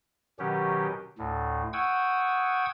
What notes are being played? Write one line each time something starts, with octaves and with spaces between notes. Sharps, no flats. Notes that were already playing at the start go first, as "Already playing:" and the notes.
B2 D#3 F#3 C#4 G4
D2 A2
F#5 G5 C#6 D#6 E6 G#6